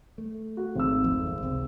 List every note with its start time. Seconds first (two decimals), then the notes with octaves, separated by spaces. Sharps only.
0.18 A3
0.57 F#4
0.76 G#1 E6
1.04 F2 F3 A3
1.26 D#1 E2
1.42 C#2 C3 C4